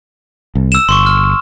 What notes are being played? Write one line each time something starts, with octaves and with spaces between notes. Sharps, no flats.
C2
E6 E7
G1 C6 C#6
F6